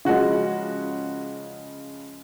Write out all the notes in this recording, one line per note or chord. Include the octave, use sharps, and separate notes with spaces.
C#3 F3 G#3 F#4